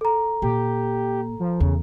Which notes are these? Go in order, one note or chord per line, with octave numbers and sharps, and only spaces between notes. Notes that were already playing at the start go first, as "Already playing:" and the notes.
A4 A#5
A#2 G4
F3
E2 C#3